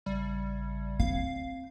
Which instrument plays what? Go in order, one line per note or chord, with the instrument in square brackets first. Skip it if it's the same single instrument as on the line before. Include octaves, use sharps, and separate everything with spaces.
[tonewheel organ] A1 C#3 [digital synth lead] G3
[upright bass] C4 [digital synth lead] F5